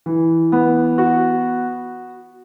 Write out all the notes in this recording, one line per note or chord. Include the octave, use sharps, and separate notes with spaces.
E3
B3
F#4